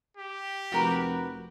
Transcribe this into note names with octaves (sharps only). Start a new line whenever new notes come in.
G4
F1 F#4 A#4 B4